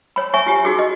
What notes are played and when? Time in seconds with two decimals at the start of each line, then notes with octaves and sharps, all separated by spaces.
0.16 C#5 B5
0.34 C#5 E5 G#5 C#6
0.46 F4 G4
0.65 D#4 F#4 G#4
0.79 D#5